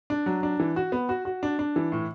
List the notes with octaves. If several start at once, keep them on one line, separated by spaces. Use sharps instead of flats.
D4
F#3
D4
E3
F#4
B3
F#4
F#4
D4
D4
E3
A2